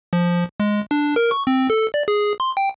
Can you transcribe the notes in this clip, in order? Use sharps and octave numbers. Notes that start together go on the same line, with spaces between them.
F3
G#3
D4
A#4
C#6
C4
A4
D5
G#4
C6
G5